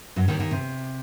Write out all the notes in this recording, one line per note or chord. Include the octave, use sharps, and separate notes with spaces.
F#2 F#3
D#2 D#3
D#2 D#3
C3